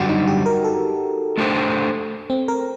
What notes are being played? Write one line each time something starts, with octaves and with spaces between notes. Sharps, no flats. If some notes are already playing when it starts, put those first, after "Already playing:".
Already playing: F#2 D3 G3 F#4
D#4
G4
A#4
A4
A3 D4 G4 C5
C4
A#4